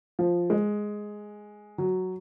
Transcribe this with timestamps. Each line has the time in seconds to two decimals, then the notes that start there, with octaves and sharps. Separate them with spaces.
0.19 F3
0.50 G#3
1.78 F#3